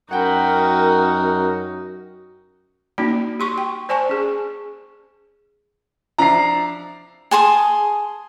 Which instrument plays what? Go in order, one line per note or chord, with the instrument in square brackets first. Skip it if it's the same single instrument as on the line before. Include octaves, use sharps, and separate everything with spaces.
[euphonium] F#2 [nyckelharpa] D#4 F#4 [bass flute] A#4 [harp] F#5 G5 B5
[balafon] A#3 C#4 D#4 F#4 D5
G4 C6 C#6
G5
C5 D5 G#5 A5 C#6
C#4 G#4
[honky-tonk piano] F3 D4 E5 [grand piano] A#5 C7
[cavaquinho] G#4 A5 C6 D#6